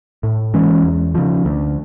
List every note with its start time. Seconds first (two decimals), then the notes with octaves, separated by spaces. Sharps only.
0.23 A2
0.54 E3 G#3 C#4
0.84 E2
1.14 C#3 F3
1.45 D2